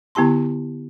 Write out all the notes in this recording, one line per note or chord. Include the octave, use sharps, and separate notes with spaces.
D3 B3 E4 G4 A5 C6